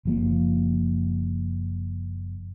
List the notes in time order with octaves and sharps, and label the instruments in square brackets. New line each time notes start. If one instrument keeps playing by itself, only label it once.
[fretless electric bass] F#1 F3 A#3